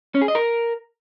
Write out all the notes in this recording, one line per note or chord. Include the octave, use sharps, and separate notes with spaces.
C#4
G#4
D#5
A#4